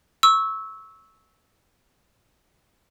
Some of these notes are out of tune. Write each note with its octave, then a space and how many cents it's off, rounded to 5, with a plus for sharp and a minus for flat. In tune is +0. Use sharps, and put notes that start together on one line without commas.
C#6 -5 E6 -15